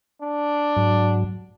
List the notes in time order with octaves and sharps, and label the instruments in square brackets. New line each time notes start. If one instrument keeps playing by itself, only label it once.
[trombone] D4
[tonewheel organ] G#2 F#3